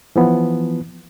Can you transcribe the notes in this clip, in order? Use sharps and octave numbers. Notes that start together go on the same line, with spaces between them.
E3 F3 B3